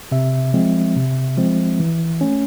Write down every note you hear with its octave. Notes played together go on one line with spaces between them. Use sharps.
C3 E5
F3 G#3 C4
C3
F3 G#3 C4
E3
A3 C#4